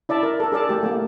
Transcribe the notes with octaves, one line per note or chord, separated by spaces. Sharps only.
E4 D5 E5 A5
A#4
A4 A#4
G#4 A4 D5 A5
A3 G4
A3 A#3